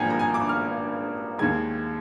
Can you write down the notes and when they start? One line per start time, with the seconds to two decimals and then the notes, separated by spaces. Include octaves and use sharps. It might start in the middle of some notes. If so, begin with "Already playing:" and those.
Already playing: G#1 G2 F3 A#3 G5 G#5 A#5
0.10 A#5
0.19 G#5
0.34 D6
0.49 F6
1.38 D#2 D#3 G#3 G#6